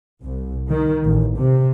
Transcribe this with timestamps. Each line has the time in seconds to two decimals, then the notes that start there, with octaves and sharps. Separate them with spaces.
0.23 C2
0.69 D#3
1.05 A1
1.38 C3